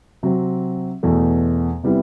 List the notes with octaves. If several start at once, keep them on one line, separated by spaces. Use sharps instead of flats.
C3 F#3 C4
E2 B2 A3
C3 G3 B3 E4